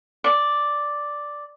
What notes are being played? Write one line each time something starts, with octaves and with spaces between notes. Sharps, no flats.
D5